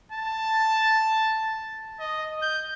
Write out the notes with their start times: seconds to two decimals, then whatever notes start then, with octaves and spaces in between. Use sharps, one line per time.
0.12 A5
2.00 D#5
2.42 G6